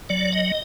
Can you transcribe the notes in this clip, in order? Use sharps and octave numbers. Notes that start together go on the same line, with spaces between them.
F#3 D5
D#5